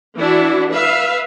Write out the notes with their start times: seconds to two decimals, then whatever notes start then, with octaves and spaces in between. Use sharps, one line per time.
0.17 E3 D4 E4 F#4
0.71 B4 E5 F5